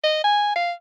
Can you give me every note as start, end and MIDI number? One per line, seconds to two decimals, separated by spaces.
0.04 0.22 75
0.24 0.51 80
0.56 0.72 77